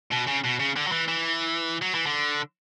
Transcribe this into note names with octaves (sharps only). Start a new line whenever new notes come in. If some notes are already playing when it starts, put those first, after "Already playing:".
B2
C#3
B2
C#3
D3
F#3
E3
E3
F#3
E3
D3